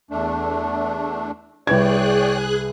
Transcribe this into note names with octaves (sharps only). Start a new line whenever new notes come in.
E2 A3 D4
C2 G#4 B4 C#5 D5 G5 F#6 G#6